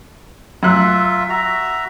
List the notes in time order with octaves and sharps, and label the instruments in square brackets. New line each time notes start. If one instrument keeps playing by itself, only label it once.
[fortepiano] F#2 F#6 [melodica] F4 E5
[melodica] F#4 E5 A#5